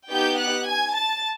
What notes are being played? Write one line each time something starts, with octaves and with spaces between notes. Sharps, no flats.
B3 D#4 G4 G5 G6
F#5 F#6
G#5 G#6
A5 A6